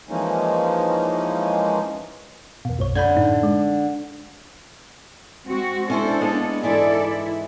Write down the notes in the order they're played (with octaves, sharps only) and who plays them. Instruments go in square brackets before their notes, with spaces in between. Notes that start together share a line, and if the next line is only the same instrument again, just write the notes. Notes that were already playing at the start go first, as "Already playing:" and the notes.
[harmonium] E3 F3 G#3 A#3 C#4 D#4
[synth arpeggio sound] E2 B2
B1 F#2 C#5
[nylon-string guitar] D3 [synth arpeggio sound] B5 G6 G#6
[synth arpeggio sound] F#2 A2 D#4
G#3
[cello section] G#3 C4 F#4
[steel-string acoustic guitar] C#4 E4 C5 [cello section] D4 A4
[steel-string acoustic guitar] G#3 A#3 B3
[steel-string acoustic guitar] G#2 E3 G#4 [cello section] E4 A4 D5
[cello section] E4